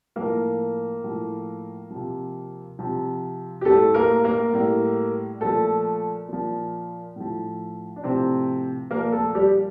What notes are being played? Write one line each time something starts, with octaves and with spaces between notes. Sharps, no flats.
A2 F3 A#3 A#4
A2 F3
C3 F3
C3 F3
G4
A2 G3 A3 A4
A#3 A#4
A#3 A#4
A2 G3
A#2 F3 A3 A4
A#2 F3
A2 F3
D4
A2 C3 F3 C4
A#2 F3 A#3 A#4
A3 A4
G3 G4